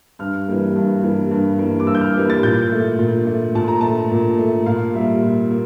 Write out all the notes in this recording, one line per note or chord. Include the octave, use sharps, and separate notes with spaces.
G2 F6
E3 G3 A#3
G2
E3 G3 A#3
G2
E3 G3 A#3
D6
G2 E6
G6
F6
E3 G3 A#3
A6
A#2 G6
A3
A#2
A3
A#2 A5
A#5
A3 A5
A#2
A3
A#2 F5
G3 A#3 E5
A#2
A#3